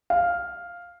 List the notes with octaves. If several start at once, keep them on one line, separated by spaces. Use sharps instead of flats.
F5